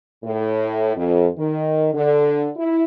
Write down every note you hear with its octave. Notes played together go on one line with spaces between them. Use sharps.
A2
F2
D#3
D3
E4